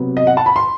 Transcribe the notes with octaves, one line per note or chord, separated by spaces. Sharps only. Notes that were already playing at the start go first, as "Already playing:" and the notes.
Already playing: C3 F#3 B3
D#5
F#5
A5
B5
C6